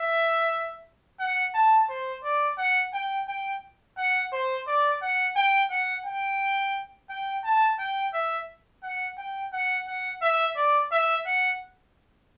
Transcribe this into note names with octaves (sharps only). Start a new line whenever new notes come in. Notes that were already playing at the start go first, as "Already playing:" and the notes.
Already playing: E5
F#5
A5
C5
D5
F#5
G5
G5
F#5
C5
D5
F#5
G5
F#5
G5
G5
A5
G5
E5
F#5
G5
F#5
F#5
E5
D5
E5
F#5